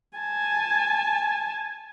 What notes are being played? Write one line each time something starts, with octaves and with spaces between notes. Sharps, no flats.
G#5 A5